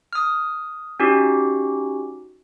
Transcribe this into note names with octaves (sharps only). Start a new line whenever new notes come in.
D#6 F6
C#4 D#4 F#4 G4